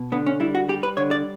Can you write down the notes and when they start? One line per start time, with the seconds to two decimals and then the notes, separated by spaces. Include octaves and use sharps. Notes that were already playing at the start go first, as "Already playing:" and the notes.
Already playing: B2
0.12 D3 B3
0.26 C#4
0.40 G3 E4
0.55 F#4
0.69 G3 G4
0.83 B4
0.97 D3 C#5
1.11 D5